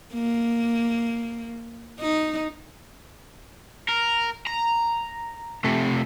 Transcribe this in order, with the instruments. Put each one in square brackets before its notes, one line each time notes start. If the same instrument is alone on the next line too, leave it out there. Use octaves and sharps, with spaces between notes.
[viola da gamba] A#3
D#4
[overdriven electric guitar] A#4
A#5
C3 A3